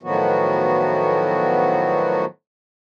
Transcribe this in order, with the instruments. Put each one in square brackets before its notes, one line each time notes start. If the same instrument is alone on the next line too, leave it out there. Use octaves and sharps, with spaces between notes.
[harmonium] A2 D#3 F3 F#3 B3 F#4